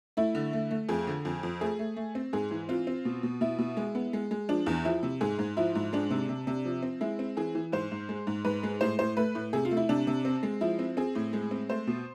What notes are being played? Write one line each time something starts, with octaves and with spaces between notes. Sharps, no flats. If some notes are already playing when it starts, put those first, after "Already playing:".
A3 E4
D3
A3
A3
F2 G#4
D3
F2
F2
A3 G#4
A3
A3
C4
G#2 G#4
E3
C4 F4
C4
B2
B2
B2 E4
B2
G#3
B3
G#3
G#3
F3 D4
E2
F3 E4
C3
G#2 G#4
G#2
F3 E4
G#2
G#3 D4
C3
C3
C3
F3
C4
G#3 E4
C4
E3 G#4
E3
G#2 C5
G#2
G#3
G#2
G#2 B4
G#3
A2 C5
A2 C5
A3 B4
A2
C3 G#4
F4
A3
E4
C3 D4
C3
C4
G#3
F3 E4
C4
C4 G#4
A2
G#3
C4
A3 C5
B2